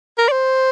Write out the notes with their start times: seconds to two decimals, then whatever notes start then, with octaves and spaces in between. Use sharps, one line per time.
0.18 A#4
0.28 D5
0.32 C5